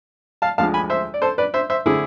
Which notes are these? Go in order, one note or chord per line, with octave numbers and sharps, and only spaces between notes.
F5 A5
D2 D3 F3 G#3 F5 A5
G#5 B5
C5 E5
D5
A4 C5
B4 D5
C5 E5
C5 E5
D3 A3 C4 E4 G#4